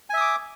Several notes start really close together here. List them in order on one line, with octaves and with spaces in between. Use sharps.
G#5 E5 D#6 D6